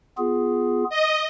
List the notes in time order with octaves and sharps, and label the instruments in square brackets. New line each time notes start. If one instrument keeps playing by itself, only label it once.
[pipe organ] B3 F4 G#4
[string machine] D#5